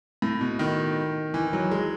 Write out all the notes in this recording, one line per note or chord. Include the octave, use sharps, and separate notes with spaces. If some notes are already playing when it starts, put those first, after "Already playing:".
A2
B2
D#3
E3
F#3
G#3